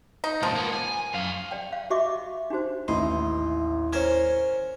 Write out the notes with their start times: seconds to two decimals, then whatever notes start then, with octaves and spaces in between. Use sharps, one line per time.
0.24 D#4
0.43 C#2 A#2 F3
0.56 A#3 B3
0.74 G#5
1.14 F#2 F5
1.51 D5 G5
1.72 F5
1.90 F#4 D#5 E5 C#6 D6
2.50 D4 D#4 F#4 C5
2.88 A1 D#2 E3 D#4 E4 C6
3.93 C#4 A#4 C5 C#5 G#6